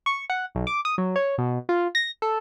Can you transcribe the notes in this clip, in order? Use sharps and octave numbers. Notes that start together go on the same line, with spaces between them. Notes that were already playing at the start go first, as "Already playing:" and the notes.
C#6
F#5
B1
D6
D#6
F#3
C#5
B2
F4
A#6
A4